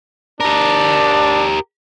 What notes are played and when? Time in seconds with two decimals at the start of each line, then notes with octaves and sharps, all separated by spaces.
0.41 D4 G4 A#4